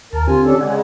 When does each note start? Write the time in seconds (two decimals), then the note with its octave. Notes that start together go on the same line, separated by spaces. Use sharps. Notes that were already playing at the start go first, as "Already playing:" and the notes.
0.13 D#2 A#4 A5
0.27 D3 C4 F4 G4 G#5
0.43 C#4 D4 A4
0.61 C#3 G#3 D5 F#5 G#5